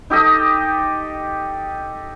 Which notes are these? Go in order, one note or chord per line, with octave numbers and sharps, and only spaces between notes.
D#4 G4 A4 D#5